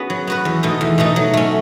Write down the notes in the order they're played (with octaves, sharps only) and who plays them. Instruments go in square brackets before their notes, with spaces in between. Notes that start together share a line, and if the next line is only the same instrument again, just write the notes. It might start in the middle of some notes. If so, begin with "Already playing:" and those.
Already playing: [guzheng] B3 C#4 F#4 G#4 B4
F#3
B3 F#4 B4
E2
B2 A3 D#4
E2
B2 A3 D#4
F#3
A3 C#4